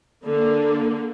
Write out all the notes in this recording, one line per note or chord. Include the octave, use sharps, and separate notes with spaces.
D3 A#3